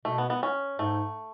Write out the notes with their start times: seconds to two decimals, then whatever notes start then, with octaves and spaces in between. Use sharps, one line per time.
0.05 B2 A3
0.18 B3
0.30 B3
0.43 C#4
0.79 G#2 A3